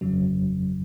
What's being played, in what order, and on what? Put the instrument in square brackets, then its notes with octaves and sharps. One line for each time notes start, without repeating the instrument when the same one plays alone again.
[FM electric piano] G1 F2 C#3 F#3